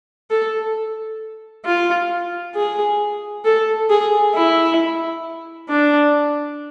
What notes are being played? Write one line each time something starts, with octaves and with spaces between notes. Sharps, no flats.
A4
F4
G#4
A4
G#4
E4
D4